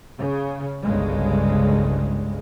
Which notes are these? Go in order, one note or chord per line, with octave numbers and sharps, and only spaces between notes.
C#3
G1 C2 G2 C#3 G#3